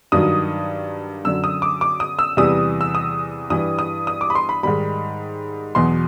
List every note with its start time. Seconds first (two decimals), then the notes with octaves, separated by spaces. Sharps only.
0.12 G2 D#3 F#3 D#6
1.25 F#2 D3 F#3 E6
1.44 D#6
1.62 D6
1.81 D6
2.00 D#6
2.19 E6
2.37 E2 C3 E3 G3 D#6
2.81 E6
2.95 D#6
3.50 G2 E3 G3 D#6
3.79 D#6
4.07 D#6
4.21 D6
4.30 B5
4.35 C6
4.49 B5
4.63 G#2 D#3 G3 B5
5.75 E2 B2 F#3 C6